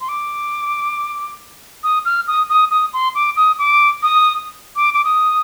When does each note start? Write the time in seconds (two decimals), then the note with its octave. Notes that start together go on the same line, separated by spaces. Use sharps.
0.01 C6
0.09 D6
1.84 D#6
2.05 F6
2.28 D#6
2.49 D#6
2.71 D#6
2.93 C6
3.15 D6
3.37 D#6
3.59 D6
4.03 D#6
4.76 D6
4.94 D6
5.05 D#6